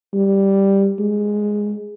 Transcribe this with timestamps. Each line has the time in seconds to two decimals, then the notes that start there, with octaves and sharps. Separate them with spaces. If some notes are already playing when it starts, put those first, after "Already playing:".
0.14 G3
0.99 G#3